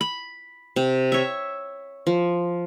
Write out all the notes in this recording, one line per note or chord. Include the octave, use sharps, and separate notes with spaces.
B5
C3
C#5 E5
F3